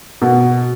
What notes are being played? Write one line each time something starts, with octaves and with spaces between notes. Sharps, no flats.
B2